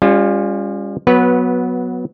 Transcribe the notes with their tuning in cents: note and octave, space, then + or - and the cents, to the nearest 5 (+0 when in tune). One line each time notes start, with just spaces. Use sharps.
G3 +40 C#4 +0 F4 +0
F#3 -15 B3 +0 B4 -15